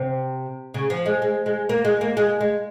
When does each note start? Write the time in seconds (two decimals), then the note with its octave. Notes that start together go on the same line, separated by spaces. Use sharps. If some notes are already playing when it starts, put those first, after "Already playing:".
Already playing: C3
0.74 C#3
0.90 F3
1.06 G#3
1.22 G#3
1.46 G#3
1.69 A#3
1.85 G#3
2.01 A#3
2.17 G#3
2.41 G#3